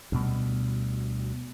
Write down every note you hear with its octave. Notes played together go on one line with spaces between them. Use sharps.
D2 B2 G3